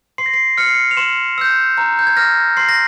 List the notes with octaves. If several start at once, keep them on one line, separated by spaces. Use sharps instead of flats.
C6 C7
A#6
C7
F6 C#7
C7
C#7
F7
C6 E7
E6 G6
A#5
G6
G#6
F6 A#6
C6 C7
A#6